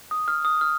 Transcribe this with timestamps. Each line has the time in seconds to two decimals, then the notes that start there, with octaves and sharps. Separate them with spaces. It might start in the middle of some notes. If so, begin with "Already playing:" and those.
0.11 D#6
0.28 F6
0.45 D#6
0.61 F6